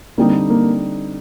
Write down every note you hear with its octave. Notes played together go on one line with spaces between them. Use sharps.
D3 G3 A#3 C4 D#4
A#3